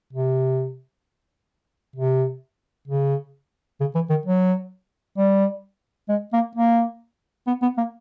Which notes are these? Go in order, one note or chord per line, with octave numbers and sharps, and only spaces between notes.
C3
C3
C#3
C#3
E3
D#3
F#3
G3
G#3
A#3
A#3
B3
B3
A#3